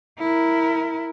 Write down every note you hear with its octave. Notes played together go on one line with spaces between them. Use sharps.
E4 A#4